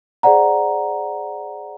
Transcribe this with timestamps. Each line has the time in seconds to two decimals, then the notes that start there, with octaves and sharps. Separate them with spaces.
0.23 G#4 C5 D5 F#5 A#5